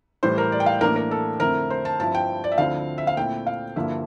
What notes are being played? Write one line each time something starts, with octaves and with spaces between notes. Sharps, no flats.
A2 E3 G3 C5
A#4
D5
G5
F5
A2 E3 A#3 D4 A#4
A#4
A4
F2 D3 A3 C4 E4 A#4
C5
A5
G2 F3 C4 E4 A5
G5
D5
E5
D2 D3 F3 C4 E4 F5
E5
F5
A#2 A3 C4 E4 G5
F5
G2 D3 F3 A#3 E4 E5